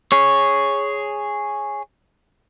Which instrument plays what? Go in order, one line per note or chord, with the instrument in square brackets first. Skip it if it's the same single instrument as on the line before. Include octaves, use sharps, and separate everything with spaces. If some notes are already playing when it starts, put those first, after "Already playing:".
[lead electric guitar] G#4 C#5